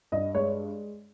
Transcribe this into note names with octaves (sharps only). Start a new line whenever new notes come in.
G2 D#5
G#3 C#5